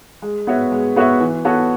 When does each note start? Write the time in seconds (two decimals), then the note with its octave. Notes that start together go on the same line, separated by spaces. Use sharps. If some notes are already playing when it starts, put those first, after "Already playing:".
0.22 G#3
0.47 B3 F#4 C#5 E5
0.72 G#3
0.96 B3 F#4 C#5 E5
1.20 E3
1.45 B3 F#4 A4 C#5